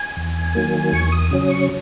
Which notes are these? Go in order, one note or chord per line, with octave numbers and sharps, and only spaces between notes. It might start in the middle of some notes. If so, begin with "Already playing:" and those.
Already playing: G#5
E2
D#3 F#3 A#3
E2 C#6
D#6
C#3 F#3 C#4 D#6
C#6